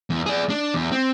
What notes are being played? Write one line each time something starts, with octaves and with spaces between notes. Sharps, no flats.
E2
G#4 D5
D4
E2
C4